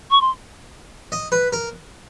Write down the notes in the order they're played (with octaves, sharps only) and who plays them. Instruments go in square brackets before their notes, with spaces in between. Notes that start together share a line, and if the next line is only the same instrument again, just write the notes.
[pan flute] C#6
C6
[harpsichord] D#5
B4
A#4